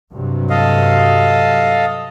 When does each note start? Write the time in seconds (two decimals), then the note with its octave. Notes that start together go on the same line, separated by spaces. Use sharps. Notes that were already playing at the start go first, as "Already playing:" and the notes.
0.12 G2 C3 F#3
0.50 A4 D#5 F5